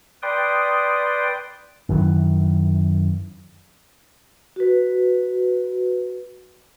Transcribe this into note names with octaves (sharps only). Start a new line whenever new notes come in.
B4 D5 G5 C6 D#6
F#2 D#3 E3
F#4 B4